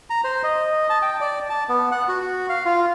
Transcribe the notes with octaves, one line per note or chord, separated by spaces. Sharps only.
A#5
C5
D#5
A5
G5
D5
A5
B3
F#5
F#4
F5
F4